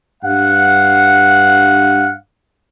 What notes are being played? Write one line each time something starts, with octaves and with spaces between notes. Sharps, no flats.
G2 F5 F#5